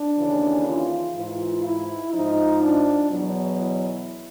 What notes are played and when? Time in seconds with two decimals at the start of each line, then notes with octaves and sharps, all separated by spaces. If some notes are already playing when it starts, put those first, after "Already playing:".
Already playing: D4
0.18 D#2 C#3 E3
0.67 F4
1.15 G#2 E3 F4
1.64 E4
2.13 G#2 F3 D#4
2.62 D4
3.10 E2 B2 F#3
3.59 E4